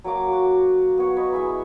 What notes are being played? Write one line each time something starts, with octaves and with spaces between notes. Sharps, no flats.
F#3 A#3 A#5 D6
F#4
B3 C#5 F#5
B4 C#5 D#5
E4 G#4 E5